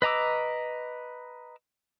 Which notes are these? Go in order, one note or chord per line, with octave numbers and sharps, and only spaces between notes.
B4 D#5 A#5 D6 E6